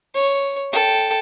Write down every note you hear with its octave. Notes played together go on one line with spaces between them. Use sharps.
C#5
A4 G5